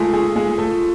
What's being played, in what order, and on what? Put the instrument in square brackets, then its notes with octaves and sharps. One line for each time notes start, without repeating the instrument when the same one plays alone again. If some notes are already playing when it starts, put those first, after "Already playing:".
Already playing: [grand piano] G#3 A3 G#4 A4 [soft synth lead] F4
[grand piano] G#3 G#4
G#3 G#4
A3 A4